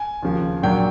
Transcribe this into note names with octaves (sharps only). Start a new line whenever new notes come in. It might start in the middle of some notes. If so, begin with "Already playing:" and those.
Already playing: G#5
D#2 C#3 F3
A#1 A#2 F#3 G5